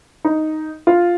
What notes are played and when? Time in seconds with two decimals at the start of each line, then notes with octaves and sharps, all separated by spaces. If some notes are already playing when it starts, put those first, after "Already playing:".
0.24 D#4
0.87 F4